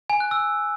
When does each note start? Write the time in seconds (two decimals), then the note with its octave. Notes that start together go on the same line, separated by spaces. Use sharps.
0.10 G#5
0.20 F#6
0.31 E6